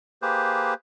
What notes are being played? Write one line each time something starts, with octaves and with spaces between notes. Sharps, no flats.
A#3 G4 G#4 B4 C5